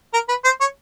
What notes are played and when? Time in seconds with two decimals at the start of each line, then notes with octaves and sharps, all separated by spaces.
0.13 A#4
0.28 B4
0.44 C5
0.60 C#5